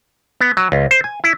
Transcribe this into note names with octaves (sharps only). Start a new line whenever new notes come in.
B3
F#3
C#2
C5
G#5
E4